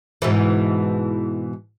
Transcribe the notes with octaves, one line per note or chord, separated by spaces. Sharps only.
G#2 B2 E3